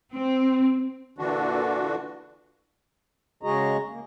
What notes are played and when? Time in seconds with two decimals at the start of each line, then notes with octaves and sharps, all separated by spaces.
0.12 C4
1.18 A#2 D3 E3 D4 F#4
3.43 C#3 G#3 F#4 G#4 D#5 A#5
3.89 A#3